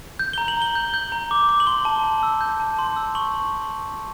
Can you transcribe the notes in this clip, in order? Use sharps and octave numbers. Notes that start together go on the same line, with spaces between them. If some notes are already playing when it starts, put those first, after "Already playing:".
G6
A#5 G7
F#7
A#5 G7
G6
G6
A#5
D6
D6
F#7
C6 G7
A5
A5
E6
G6
A5
C6
E6
C#6 F#7